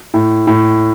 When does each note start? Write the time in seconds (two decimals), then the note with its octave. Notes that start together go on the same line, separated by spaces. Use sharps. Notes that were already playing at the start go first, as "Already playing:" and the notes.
0.14 A2
0.47 A2